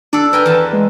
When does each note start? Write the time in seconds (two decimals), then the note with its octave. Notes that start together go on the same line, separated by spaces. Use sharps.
0.13 D4 A4 D5
0.33 A#4 B4 G5 G#5
0.46 E2 A5
0.73 G#3